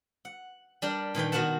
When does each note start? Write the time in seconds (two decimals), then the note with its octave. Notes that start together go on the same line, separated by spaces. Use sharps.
0.25 F#5
0.82 G3 D4 A#4
1.15 A#2 D#3 B4 G5
1.32 B2 D#3 F#4 A#4 F#5 A5